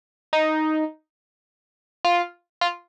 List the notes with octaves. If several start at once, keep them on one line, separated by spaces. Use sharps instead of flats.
D#4
F4
F4